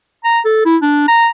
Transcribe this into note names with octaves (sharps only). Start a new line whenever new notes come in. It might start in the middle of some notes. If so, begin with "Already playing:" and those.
A#5
A4
E4
D4
A#5